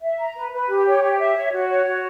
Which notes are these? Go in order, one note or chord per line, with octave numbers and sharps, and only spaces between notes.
E5
A#5
B4
B4
G4
C#5
G4
E5
C#5
F#4
C#5
F#4